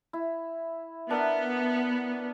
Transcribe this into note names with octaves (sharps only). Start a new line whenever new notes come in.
E4
B3 D4 A#4 E5